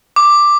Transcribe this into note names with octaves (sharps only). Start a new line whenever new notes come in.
D6